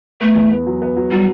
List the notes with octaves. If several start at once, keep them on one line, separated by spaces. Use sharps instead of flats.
A3 B3
E2
B3
F#3
B3
F#3
F#3 G3